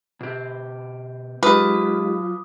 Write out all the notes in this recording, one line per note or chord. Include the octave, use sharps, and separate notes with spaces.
B2 G4
F#3 G#3 D#4 F4 G4 B4 D6 D#6